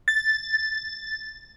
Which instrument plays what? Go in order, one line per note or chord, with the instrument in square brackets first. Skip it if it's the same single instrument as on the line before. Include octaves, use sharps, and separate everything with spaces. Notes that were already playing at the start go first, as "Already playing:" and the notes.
[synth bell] A6